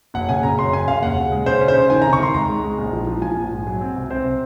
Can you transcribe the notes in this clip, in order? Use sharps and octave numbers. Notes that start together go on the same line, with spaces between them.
F#1 F#5
C#3 G#5
C#3 A#5
F#2 C6
F#2 G#5
C#3 F5
D#2 F#5
C#3
G#3
C#3 C5
C#4
C5
C#3
D#3 G#5
C3 A#5
C#6
D#3 C6
C#2 A#5
G#3
G#3
A#1
F3
F3
F3 G#5
A#1
G#2
F#3
C4
C2
C4 C5
C3